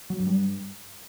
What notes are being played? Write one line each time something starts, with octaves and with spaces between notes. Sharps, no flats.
F#3
G2
G3